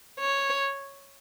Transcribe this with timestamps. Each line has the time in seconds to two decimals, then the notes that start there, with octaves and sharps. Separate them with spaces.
0.20 C#5